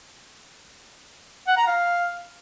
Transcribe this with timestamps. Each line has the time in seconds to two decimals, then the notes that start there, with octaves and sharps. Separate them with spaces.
1.47 F#5
1.57 A#5
1.67 F5